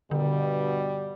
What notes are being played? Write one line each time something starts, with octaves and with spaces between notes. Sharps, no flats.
G2 B2 D3 G3